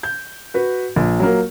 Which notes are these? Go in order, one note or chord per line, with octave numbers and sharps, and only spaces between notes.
G6
F#4 B4
A#1
F#3 A#3